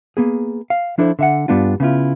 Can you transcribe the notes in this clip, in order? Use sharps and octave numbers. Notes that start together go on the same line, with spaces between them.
A#3 B3 G#4
F5
F3 D4 E4 A4 A#4 C5
D3 E5 F#5
G2 D3 G3 B3 D4 F4
C#3 B3 E4 F4